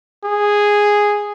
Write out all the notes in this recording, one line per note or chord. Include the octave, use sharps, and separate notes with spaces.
G#4